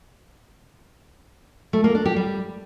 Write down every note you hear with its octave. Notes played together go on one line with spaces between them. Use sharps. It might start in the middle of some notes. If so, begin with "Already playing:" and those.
A3
A#3
D4
G4
G3